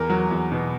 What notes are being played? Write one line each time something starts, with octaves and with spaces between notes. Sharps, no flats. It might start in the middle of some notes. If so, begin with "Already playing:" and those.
Already playing: E2 A#4
F#3
E2
B2